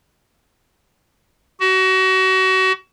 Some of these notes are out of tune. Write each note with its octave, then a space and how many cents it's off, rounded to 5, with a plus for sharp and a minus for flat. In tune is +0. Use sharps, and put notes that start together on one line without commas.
F#4 +30